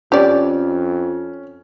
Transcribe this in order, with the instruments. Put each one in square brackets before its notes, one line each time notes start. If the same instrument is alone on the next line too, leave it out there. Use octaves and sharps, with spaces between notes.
[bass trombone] F2 [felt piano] C#4 [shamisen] G4 D5